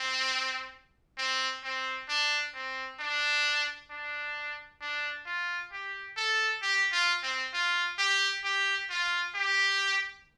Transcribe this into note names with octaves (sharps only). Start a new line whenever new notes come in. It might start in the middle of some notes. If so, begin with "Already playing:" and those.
Already playing: C4
C4
C4
D4
C4
D4
D4
D4
F4
G4
A4
G4
F4
C4
F4
G4
G4
F4
G4